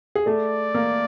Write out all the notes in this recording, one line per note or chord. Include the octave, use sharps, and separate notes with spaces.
G#4
A3 A4 D5
A#3 A#4